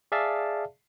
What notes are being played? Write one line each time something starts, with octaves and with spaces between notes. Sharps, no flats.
G#4 D5 E5 F5 A5